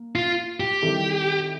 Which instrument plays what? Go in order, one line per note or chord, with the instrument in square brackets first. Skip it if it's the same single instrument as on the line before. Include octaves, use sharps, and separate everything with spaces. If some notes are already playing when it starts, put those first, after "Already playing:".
Already playing: [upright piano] A#3
[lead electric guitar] F4
G4
[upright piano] D#3 G3 C4 E4 A4